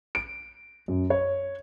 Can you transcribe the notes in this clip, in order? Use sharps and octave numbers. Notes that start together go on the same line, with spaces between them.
D7
F#2
C#5